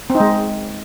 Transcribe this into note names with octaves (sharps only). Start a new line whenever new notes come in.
C4
D#4
G#3